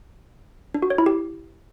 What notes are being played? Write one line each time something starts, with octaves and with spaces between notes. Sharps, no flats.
D4
F#4
C#5
E4
G4